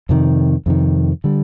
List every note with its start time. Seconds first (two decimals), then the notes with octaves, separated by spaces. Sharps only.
0.09 F2 C3 D#3
0.66 F2 C3 D#3
1.24 D3 G3